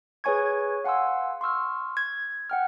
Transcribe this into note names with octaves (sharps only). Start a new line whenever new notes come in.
G#4 B4 C#5 G#5 C#6 G#6
F5 F#5 G#5 C6 E6
C6 C#6 E6 F6
G#6
F#5 G5 F6